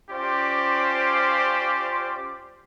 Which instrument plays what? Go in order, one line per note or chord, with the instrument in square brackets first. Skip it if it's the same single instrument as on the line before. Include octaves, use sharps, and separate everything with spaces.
[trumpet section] C#4 F4 G4 C5 D5